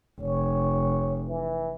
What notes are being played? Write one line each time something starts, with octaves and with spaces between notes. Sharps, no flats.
F1 C#5
E3